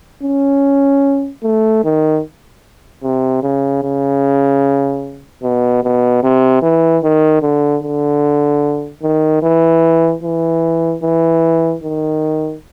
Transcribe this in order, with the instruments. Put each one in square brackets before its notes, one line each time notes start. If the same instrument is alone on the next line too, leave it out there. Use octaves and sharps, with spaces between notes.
[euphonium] C#4
A3
D#3
C3
C#3
C#3
B2
B2
C3
E3
D#3
D3
D3
D#3
E3
E3
E3
D#3